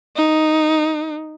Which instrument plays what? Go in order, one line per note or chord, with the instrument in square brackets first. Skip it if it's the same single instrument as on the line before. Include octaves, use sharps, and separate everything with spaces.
[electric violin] D#4